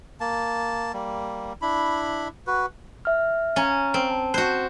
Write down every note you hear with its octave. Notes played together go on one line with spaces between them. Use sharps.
A#3 A5
G3 A#3
D4 E4 B5
F#4 B4
E5 F6
C#4 F5 A#5 A6
C4
A5
F#4 C5 F#6 G6